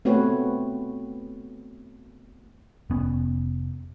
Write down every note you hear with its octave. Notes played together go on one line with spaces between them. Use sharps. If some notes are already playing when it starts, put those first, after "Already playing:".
A3 B3 C4 F#4 B4 C#5
F1 B3 C#4